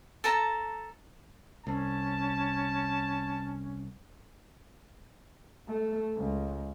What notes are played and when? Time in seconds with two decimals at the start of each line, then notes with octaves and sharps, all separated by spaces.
0.24 A4 A5 A#5
1.67 C2 C#4 A5
5.68 A3
6.17 C#2